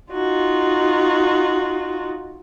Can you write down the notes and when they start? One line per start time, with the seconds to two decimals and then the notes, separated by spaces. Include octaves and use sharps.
0.13 D#4 F4 F#4